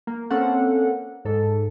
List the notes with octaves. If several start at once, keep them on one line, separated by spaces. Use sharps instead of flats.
A#3
A#3 C4 C#4 A4 F#5
G#2 A4